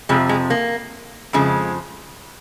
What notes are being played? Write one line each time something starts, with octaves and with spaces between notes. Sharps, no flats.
F2 C3 F3 G#3
G#3
A#3
F2 C#3 F3 G#3